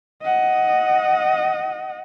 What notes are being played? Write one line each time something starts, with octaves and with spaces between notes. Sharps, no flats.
D#5 F#5